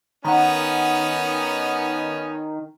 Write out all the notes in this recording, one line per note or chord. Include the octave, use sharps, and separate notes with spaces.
D#3 B3 C#4 D#4 F#5 A#5